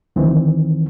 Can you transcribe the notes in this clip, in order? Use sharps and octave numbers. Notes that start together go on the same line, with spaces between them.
D2 D#3 E3 C4